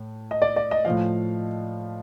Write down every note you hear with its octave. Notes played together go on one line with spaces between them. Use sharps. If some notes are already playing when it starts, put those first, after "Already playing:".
Already playing: A2
D#5
D5
D5
D#5
A2 F3 F5